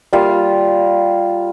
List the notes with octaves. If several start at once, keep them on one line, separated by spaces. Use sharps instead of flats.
G3 A#3 F4 F5